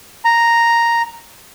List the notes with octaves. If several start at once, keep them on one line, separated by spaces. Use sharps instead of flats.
A#5